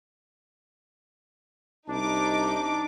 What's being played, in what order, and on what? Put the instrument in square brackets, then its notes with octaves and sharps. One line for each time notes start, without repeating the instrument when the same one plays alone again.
[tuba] C2 [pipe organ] D4 [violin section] D#4 D6